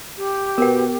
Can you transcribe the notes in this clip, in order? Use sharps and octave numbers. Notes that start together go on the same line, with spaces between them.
G4
B2 B3 F#4 A#4 B4 G5